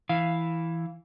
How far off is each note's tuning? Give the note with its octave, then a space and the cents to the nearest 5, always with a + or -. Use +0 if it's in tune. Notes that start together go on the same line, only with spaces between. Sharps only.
E3 +0 F5 +0